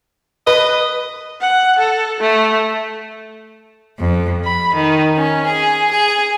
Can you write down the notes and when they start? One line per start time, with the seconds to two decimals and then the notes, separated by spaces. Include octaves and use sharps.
0.47 B4 D#5
1.41 F#5
1.78 A4
2.20 A3
3.97 F2
4.44 B5
4.73 D#3
5.17 C#4
5.46 G#4
5.90 G#4